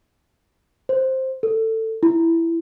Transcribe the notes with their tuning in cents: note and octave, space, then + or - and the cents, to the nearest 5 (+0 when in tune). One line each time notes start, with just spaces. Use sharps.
C5 +5
A4 +20
E4 +10